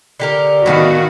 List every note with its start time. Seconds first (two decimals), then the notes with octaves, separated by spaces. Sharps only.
0.20 D3 G4 A#4
0.66 A2 D#3 B3 F#4 F5